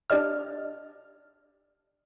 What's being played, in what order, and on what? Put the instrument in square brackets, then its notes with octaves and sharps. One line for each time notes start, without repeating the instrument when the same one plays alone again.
[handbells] D4 G4 D5 D#5 F6